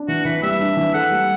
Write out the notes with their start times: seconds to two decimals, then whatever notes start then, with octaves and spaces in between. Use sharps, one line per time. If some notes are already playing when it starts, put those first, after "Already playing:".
Already playing: D4
0.08 E3 F#4
0.25 E3 B4
0.43 G3 E5
0.60 D4
0.77 E3
0.94 A4 F#5
1.11 G3